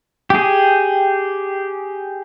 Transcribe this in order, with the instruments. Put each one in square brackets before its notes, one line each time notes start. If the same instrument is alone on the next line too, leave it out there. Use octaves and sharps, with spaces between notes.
[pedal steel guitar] G4 G#4